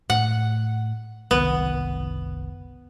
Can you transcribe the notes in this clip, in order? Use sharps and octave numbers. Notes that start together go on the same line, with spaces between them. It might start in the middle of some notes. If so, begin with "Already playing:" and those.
A2 F#5
F#1 C2 D#3 B3